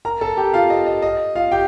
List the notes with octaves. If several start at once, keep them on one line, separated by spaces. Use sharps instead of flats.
A#4 A#5
A4 A5
A5
G4 G5
F4 F5
D#5
D#5
D#5
F4 F5
G4 G5